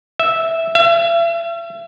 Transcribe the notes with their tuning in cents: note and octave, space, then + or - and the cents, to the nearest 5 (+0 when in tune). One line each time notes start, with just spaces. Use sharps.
E5 -5
E5 +40